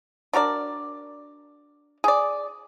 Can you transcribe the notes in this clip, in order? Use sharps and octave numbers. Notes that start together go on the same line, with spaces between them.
D4 F#4 A#4 D5
G#4 D5